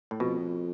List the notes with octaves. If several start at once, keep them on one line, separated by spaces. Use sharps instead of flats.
A2
F2 B2